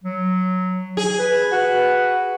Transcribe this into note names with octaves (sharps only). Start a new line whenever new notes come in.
F#3
G#4
B4
F#4 B4